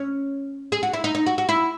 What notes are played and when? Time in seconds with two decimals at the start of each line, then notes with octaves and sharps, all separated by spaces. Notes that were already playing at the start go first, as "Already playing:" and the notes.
Already playing: C#4
0.72 G#4
0.83 F#4
0.94 E4
1.04 D#4
1.15 D#4
1.26 F#4
1.38 F#4
1.49 E4